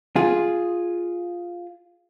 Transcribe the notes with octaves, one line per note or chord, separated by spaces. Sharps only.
F4 G#4